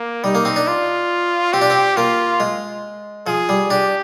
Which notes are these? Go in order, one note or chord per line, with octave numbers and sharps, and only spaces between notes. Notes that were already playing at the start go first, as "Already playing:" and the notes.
Already playing: A#3
G3 D#4
A#3
C4
D4
F4
C4 G4
D4
C4
A#3 F4
G#3
F3 G#4
G3
D4 G4